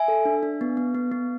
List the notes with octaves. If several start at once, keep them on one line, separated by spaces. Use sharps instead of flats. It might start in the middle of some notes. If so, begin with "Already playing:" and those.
Already playing: E5 G#5
A4
D4
D4
B3
B3
B3
B3